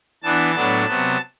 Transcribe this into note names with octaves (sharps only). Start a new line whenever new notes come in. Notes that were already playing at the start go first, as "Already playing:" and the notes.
E3 B3 D4 A5
A2 F#3 B3 D4
C3 F#3 B3